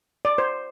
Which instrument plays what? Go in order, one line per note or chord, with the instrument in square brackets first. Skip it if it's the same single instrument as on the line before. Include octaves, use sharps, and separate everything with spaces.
[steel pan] D5
C5